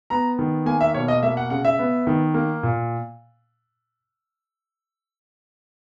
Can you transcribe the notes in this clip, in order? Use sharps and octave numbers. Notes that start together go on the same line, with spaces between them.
B3 A#5
D#3
A#3 G#5
E5
B2 C#5
D#5
A#3 E5
F#5
C#3 F#5
E5
B3
D#3
A#3
A#2